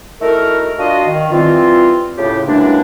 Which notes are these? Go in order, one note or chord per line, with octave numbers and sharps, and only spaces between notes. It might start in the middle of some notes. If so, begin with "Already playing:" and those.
A3 D#4 E4 F#4 A4 A#4
D4 F4 F#4 D#5
D#3
E3 F3 G3 C4 F4
A2 C#3 F4 G4
F#2 C3 E3 G#3 A#3 D4